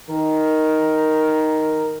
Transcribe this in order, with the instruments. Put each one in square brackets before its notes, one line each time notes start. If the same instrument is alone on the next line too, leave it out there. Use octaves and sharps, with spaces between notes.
[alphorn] D#3 [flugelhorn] A#4